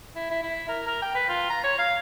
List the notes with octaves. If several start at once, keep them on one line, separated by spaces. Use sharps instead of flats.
E4
E4
E4
A#4
A#4
G5
B4
F4
A#5
C#5
F5